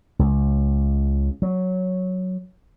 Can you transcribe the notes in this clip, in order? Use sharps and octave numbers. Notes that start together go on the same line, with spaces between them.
C#2
F#3